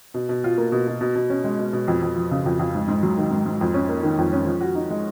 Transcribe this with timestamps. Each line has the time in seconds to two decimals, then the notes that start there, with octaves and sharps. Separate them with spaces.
0.14 B2
0.29 B2
0.44 F4
0.58 A#3
0.72 B2
0.87 B2
1.01 B2
1.15 B2
1.30 C#4
1.44 G#3
1.59 B2
1.73 B2
1.88 F2
2.02 F2
2.16 F3
2.31 C#3
2.46 F2
2.59 F2
2.75 G#2
2.88 G#2
3.03 F#3
3.18 D#3
3.31 G#2
3.46 G#2
3.61 F2
3.74 C#4
3.89 A#3
4.03 D#3
4.18 F2
4.33 C#4
4.46 F3
4.61 F#4
4.75 D#4
4.90 G#3